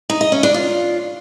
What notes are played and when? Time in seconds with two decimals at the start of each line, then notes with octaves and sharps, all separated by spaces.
0.10 D#4
0.21 D#5
0.32 C#4
0.43 D4
0.54 F4